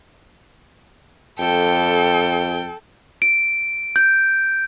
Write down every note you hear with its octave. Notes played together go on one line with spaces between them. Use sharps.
F2 A4 G5
D7
G6